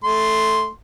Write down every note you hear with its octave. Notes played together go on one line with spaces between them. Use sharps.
A3 C6